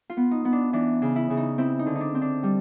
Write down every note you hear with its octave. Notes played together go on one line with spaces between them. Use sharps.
F4
B3
D#4
B3
D4
E3 D4
C#3
E4
C#3
D#4
C4 E4
D#4
D3
D#4
D4
C4
D4
G3